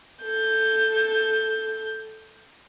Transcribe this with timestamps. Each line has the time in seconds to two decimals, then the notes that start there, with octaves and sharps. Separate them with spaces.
0.23 A4 G6